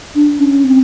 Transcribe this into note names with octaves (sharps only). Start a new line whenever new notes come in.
D4
C#4
C4